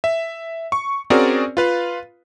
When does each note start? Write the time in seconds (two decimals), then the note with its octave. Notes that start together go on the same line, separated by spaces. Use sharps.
0.04 E5
0.72 C#6
1.10 C4 C#4 F#4 G#4 A#4 D5
1.57 F4 B4 F5